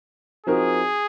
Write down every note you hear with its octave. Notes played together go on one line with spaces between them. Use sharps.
F3 C4 D#4 F#4 G#4 A#4